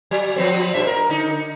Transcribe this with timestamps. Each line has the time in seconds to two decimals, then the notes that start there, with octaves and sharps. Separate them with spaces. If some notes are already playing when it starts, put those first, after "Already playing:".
0.11 F#3
0.36 F3 B3 C4
0.74 G2 B2 E5
0.87 A#4
1.09 D3 D#4